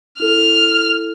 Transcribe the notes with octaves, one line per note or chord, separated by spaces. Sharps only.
E4 A4 F6